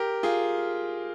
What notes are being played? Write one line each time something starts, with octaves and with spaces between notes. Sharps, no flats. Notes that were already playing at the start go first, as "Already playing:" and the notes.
Already playing: G4 A#4
F4 G#4